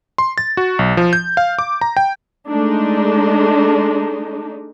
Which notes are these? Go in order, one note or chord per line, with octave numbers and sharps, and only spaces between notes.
C6
A6
F#4
B1
F3
G6
F5
D6
A#5
G5
G#3 A3 D4 D#4